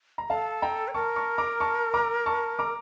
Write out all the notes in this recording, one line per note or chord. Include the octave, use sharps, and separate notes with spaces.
A#5
A4 F5 A5
G5 A#5
C#5
A#4 A5 C#6
A5 C#6
A#5 D6
A5 C#6
A#5 D6
A5 C#6
A#5 D6